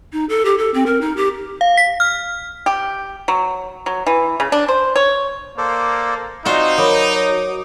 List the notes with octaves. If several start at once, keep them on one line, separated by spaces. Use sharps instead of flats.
D#4
A4
G4
A4
C4
A#4
D#4
G4
F5
B6
F6
G4
F#3
F#3
E3
C#3
D4
C5
C#5
A#3 A4 C5 D5
C4 D#4 F4 F#4 C5 D5 D#5 C6
F#3 A#4 B5 D6 D#6
C#5